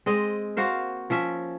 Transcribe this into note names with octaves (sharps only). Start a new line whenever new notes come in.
G#3 C4 D#5
A#3 F#4 C5 F5
F3 C#4 E5